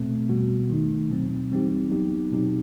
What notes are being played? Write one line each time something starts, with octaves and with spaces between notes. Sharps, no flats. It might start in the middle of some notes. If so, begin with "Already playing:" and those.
Already playing: B2 A3 C4
B2 G3 B3 F#4
D#3 A3 D#4
B2 F#3 C4
E3 G3 C4 D#4 G4
F#3 B3 D#4 G4
B2 F#3 C4 D#4 G4